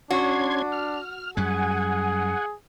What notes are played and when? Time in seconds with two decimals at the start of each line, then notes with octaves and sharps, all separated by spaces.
0.11 C#4 D4 F#4 C6 G#6
0.72 F6
1.37 F#2 G3 G#4 F#5 G#5